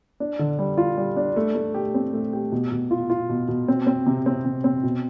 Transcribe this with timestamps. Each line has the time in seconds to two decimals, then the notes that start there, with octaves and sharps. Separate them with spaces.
0.20 D4
0.39 D3
0.59 G3
0.78 F4
0.97 G3
1.17 D4
1.36 A3
1.55 A3
1.74 G4
1.94 C4
2.13 A3
2.33 G4
2.52 B2
2.72 B2
2.91 F4
3.10 F4
3.29 B2
3.48 B2
3.68 C4
3.87 C4
4.06 C3
4.26 C4
4.45 C3
4.64 C4
4.83 B2